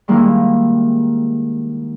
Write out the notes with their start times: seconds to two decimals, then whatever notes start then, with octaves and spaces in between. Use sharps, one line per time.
0.08 D#3 G3 G#3 A#3 E4